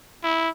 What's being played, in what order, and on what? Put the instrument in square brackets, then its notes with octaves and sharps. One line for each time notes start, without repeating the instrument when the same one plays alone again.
[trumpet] E4